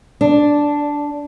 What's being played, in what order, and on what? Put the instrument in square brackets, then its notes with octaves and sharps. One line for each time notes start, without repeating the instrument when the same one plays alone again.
[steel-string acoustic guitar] D4